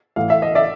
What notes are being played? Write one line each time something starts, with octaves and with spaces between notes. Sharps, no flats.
A1 A2 E3 F5
E5
D#5
D5 E5